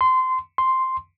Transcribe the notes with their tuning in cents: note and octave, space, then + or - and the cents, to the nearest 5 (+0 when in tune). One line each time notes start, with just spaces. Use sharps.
C6 -20
C6 +0